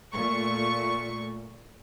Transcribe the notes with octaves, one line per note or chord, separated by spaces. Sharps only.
A#2 A3 C#6